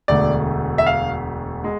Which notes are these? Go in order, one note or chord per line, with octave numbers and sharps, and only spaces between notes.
E1 D2 D3 A3 D5
E5
F5
G#3